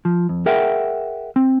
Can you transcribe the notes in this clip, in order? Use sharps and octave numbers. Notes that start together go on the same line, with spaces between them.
F3
F2
G#4 A#4 E5 F#5 G5
C4